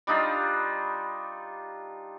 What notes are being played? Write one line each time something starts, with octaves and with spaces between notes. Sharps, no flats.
G3 D4 D#4 F4